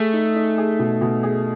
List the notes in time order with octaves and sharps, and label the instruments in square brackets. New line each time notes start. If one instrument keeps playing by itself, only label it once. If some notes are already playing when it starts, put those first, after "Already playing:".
Already playing: [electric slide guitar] A3 [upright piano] G#4
[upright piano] D#4
D#4
G#4
B2
B2
G#4